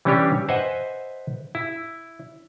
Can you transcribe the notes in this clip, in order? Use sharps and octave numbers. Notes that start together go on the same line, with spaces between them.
E3 G3 C#4 D4 G4 C#5
B4 C5 D#5 E5 F#5 G#5
E4